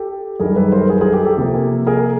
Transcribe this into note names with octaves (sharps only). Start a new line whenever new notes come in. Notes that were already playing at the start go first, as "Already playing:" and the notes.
Already playing: G4 A4
F#2 D#3 G3 G#4 A#4
A4 B4
A#4 C5
G#4 A#4
G#4 A#4
G4 A4
G4 A4
C3 F3 A#3
G#4 A#4